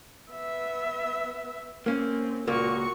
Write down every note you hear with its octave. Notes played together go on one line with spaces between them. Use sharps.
B3 E5
A#3 C4 C#4
C#2 A#2 A#3 F#4 C#6